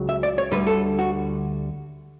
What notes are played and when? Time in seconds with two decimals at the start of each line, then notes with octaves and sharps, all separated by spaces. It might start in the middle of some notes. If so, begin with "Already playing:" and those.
Already playing: C#2 C#3 F#3
0.09 E5
0.23 D5
0.38 C#5
0.52 D2 D3 G3 B4
0.67 A4
0.99 F#4